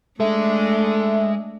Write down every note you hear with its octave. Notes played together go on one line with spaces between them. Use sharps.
G#3 A3 D4 A4 E5